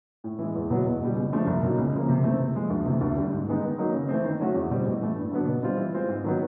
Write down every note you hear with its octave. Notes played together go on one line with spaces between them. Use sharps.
A2
E3 G#3
E2
B2 F#3 B3 E4
E2
B2 G3
C#2
C#3 F3 A3 D4
C2
B2 F#3 A#3 D#4
C#2
C#3 F3 A#3
C3
E3 A3 C4
C3
F3 G#3
D2
C3 E3 A3
D2
D3 G3
G#2
D#3 G#3 B3 D#4
D#3
F#3 A#3 D#4
C#3
E3 A3 C4
D#3
F#3 A3 C#4 F#4
E2
B2 G3 C4
A2
E3 A3
G2
D3 F#3 B3 D4
B2
G3 C4 F4
E3
G#3 C4 F4
G#2
D#3 F#3 B3